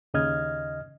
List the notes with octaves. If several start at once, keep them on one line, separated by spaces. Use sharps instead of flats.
D#2 C#3 D#5 F6 G#6